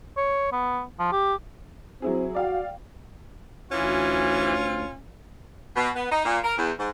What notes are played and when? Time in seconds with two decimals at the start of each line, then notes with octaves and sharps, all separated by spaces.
0.17 C#5
0.52 B3
0.99 F3
1.12 G4
2.02 F#3 C4 E4 G#4
2.35 F#4 D5 F5 G5
3.72 D2 E3 C#4 F4
5.75 B2
5.95 B3
6.10 D#4
6.24 A#2
6.43 A#4
6.56 E2
6.77 G#2